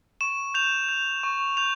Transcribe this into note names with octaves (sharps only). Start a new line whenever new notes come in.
C#6 E7
G6 F7
G6
C#6
G6 F7